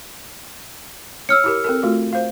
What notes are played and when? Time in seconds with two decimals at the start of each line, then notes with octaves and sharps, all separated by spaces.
1.29 C#5 E6 F6 C#7
1.44 E4 G4 A#4
1.64 C4 A4 A#4
1.83 A3 F4 F#4
2.13 C5 F5